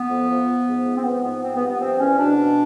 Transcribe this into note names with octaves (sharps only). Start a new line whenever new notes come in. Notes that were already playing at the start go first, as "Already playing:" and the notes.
Already playing: B3
F2
F3
F3
G#2
G#2
C4
F3 B3
G#2 B3
F3 C4
B3
G2
B3
F3 C4
E2 C#4
B2 D4
B2